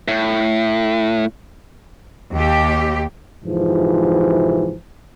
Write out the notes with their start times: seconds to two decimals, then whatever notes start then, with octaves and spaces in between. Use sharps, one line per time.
0.08 A2
2.33 D#2 G4
3.44 F2 G#2 C3 E3 F3